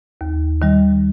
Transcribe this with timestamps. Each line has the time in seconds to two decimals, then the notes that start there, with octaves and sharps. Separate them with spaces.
0.21 D#2
0.62 D#3 G3